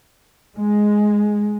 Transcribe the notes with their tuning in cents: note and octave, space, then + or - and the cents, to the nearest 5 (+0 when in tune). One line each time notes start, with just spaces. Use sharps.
G#3 +5